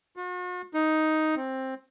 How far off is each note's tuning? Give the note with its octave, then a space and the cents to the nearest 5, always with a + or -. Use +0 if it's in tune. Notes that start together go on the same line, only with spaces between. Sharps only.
F#4 -45
D#4 +5
C4 +10